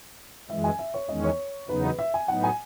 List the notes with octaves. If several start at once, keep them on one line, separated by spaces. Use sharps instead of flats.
F#2 E3 G#3 E5
G#5
E5
C#5
E2 D#3 G#3 C#4 D#5
C#5
E2 C#3 F#3 B3 D#4 B4
B4
E5
G#5
A2 F#3 B3 D#4 F#5
G#5